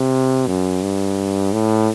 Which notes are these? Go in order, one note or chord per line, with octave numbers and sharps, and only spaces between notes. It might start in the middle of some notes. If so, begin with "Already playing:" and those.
Already playing: C3
F#2
G2
A2